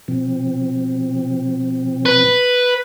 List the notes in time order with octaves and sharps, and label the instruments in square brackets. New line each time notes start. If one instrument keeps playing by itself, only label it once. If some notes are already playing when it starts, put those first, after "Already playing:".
[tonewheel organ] B2 F3 C4
[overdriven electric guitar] B4